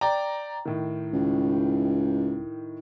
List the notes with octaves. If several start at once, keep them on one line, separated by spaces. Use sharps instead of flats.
D5 G5 A#5
A2 D#3
C#2